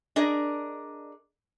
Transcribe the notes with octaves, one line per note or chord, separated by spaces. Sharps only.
D4 G#4 A#4 D#5